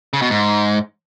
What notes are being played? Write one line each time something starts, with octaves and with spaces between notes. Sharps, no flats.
C#3
B2
G#2